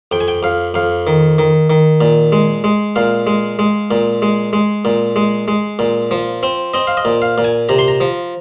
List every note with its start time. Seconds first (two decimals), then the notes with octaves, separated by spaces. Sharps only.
0.12 F2 G5
0.20 G#5
0.28 G5
0.43 F2 F5
0.74 F2 F5
1.07 D#3
1.38 D#3
1.70 D#3
2.01 A#2
2.32 G#3
2.64 G#3
2.96 A#2 F5
3.27 G#3
3.59 G#3
3.91 A#2
4.22 G#3
4.53 G#3
4.85 A#2
5.16 G#3
5.48 G#3
5.79 A#2
6.11 F3
6.43 C4
6.74 C4 D#5
6.87 F5
6.97 D#5
7.05 A#2
7.22 F5
7.38 A#2
7.44 G#5
7.69 C3 A#5
7.79 C6
7.88 A#5
8.01 F3